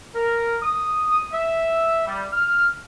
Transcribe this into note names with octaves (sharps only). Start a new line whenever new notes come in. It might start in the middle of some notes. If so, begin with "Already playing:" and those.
A#4
D#6
E5
G3
F6